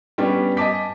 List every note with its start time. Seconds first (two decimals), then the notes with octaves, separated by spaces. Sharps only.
0.18 G3 B3 C#4 D4
0.57 D#5 G#5 A5 D6 B6